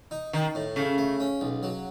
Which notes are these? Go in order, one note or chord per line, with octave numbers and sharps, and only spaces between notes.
D#4
D#3 D#4
A2
C#3 A3
A3
C#4
B1
F#3